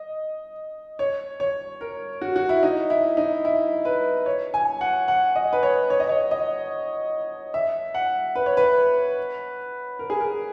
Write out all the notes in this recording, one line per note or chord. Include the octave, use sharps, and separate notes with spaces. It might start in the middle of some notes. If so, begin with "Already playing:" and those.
Already playing: D#5
C#5
C#5
A#4
F#4
F#4
E4
D#4
E4
D#4
E4
B4
C#5
G#5
F#5
F#5
D#5
B4
C#5
C#5
D#5
C#5
D#5
E5
F#5
B4
C#5
B4
A#4
G#4
A#4